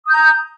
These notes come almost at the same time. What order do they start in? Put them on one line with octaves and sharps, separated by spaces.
D#6 G6 A#5